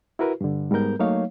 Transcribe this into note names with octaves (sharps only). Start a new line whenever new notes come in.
E4 F#4 A#4 B4
G2 D3
G#2 G3 B3 A#4 G6
F#3 A3 A#3 D#4 C#5 F5